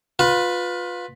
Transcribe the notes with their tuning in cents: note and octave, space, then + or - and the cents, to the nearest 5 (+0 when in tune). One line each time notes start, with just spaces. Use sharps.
F4 +25 B4 +0